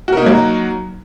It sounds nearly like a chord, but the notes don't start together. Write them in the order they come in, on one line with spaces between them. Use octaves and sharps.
F#4 A#4 D#4 A#3 F#3